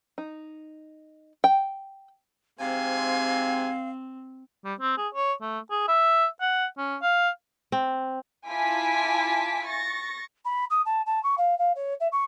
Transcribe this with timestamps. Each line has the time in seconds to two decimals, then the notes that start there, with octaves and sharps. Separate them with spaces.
0.18 D#4
1.44 G5
2.59 G#2 C3 C4 F5 G#5
4.65 G3
4.80 C4
4.97 G#4
5.15 C#5
5.42 A3
5.71 G#4
5.88 E5
6.41 F#5
6.78 C#4
7.02 F5
7.72 C4
8.48 E4 F4 G#5 A5 D6 B6
9.67 C#6 A6 A#6
10.44 B5
10.70 D#6
10.85 A5
11.06 A5
11.23 C#6
11.37 F5
11.58 F5
11.75 C#5
12.00 E5
12.11 C#6